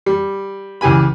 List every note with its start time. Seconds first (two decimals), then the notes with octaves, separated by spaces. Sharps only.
0.06 G3
0.81 C#2 E3 G4 G#5 B5